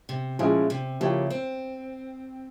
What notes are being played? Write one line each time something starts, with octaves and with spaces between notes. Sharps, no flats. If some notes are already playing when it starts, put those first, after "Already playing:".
C3
A#2 F3 G#3 C#4 E4 G#4
C3
C#3 F3 A#3 E4 G4 C#5
C4